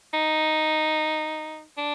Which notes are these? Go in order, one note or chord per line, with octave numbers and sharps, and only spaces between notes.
D#4
D4